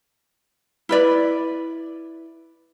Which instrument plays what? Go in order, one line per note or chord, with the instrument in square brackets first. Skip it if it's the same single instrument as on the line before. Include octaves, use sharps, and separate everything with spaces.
[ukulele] E4 B4 D5